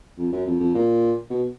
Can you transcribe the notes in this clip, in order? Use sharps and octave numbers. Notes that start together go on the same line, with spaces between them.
F2
F#2
F2
F2
A#2
B2